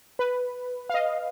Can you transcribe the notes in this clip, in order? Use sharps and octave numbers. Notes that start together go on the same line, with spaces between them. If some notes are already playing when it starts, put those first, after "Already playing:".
B4
F5
D#5